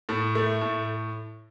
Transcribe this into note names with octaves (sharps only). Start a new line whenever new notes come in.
A2
A3
A2